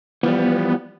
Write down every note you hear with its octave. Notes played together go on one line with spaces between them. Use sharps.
E3 F3 G3 B3